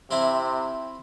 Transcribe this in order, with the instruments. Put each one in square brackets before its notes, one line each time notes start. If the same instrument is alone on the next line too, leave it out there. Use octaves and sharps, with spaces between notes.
[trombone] C3 [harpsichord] C4 E4